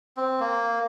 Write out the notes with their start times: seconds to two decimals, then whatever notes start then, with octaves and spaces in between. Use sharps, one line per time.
0.17 C4
0.40 A#3